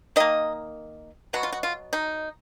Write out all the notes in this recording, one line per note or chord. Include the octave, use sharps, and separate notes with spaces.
D#3 A#3 D#5
B2 F#3 B3 F#4
F4
F#4
F4
D#4